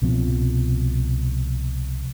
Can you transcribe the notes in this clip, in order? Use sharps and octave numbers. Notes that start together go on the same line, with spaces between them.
C2 B2 F3 C4